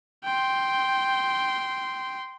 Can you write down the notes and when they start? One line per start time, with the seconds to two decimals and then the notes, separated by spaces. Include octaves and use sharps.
0.25 G5 C6